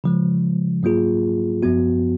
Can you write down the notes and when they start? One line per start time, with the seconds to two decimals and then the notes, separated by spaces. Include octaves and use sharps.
0.04 C#3 F3 G#3
0.83 G#2 F#3 A#3 F4 G#4
1.63 F#2 F3 B3 F#4